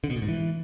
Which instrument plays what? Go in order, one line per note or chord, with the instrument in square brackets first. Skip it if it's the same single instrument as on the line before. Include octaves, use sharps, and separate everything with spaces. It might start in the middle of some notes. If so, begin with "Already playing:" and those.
[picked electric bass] D3
B2
A#2
G#2
E3